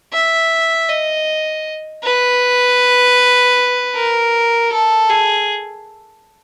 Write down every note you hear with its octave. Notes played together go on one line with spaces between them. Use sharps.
E5
D#5
B4
A#4
A4
G#4